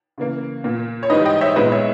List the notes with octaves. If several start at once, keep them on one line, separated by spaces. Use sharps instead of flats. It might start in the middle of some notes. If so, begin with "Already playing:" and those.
C#3 E3 A#3
A#2 A#3
C#5
G#2 E3 G3 B4 D#5
D#5 G5
C#5 E5
A#2 G#3 B3 B4 D#5
C#5 E5